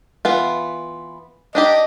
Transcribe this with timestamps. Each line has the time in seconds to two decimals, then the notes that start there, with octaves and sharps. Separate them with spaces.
0.25 E3 B3 F4
1.55 D4 D#4 G4 D#5